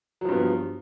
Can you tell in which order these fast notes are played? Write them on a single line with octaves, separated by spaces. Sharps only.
F#3 F3 G2 B3